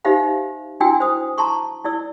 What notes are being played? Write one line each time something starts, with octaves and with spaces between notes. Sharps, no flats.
D#4 G4 C5 E5 F5 B5
D4 E4 F#4 G5 G#5 E6
C5 D#6
A5 A#5 C6 C#6
E4 D5 E6